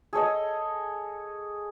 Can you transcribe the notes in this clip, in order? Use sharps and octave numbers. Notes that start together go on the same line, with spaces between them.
G#4 A4 C#5 D#5